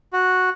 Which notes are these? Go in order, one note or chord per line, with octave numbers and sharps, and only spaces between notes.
F#4